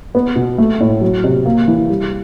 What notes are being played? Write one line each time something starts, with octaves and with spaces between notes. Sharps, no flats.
B3
B2
A3
A2
F#3
C3
A#3
E3
G3